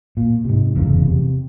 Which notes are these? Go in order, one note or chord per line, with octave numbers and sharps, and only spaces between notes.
A#2
G#2 C3
F1 E2 G#2 C#3
C3